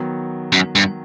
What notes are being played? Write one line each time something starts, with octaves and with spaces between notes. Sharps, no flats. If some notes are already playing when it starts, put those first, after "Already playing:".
Already playing: D#3 F#3 B3
F#2
G2